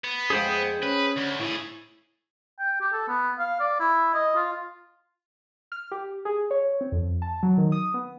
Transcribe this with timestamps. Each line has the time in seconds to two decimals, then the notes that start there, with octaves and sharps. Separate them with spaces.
0.04 B3
0.30 F2 G#3 D4 G#4 C5 G5
0.82 C#4 B4
1.16 D2
1.40 A2 E4 G#4 E5
2.59 G5
2.81 G4
2.92 A4
3.08 B3
3.39 F5
3.60 D5
3.80 E4
4.14 D#5
4.36 F4
5.72 F6
5.91 G4
6.25 G#4
6.51 C#5
6.81 C4
6.92 F2
7.22 A5
7.43 F#3
7.58 D#3
7.72 D#6
7.94 B3